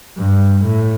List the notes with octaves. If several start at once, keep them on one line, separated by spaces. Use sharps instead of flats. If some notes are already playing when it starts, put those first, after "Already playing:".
G2
A2